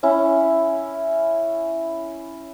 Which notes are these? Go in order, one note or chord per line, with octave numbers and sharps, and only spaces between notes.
C#4 E4